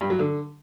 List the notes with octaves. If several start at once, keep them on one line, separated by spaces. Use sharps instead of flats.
G2
F#3
D3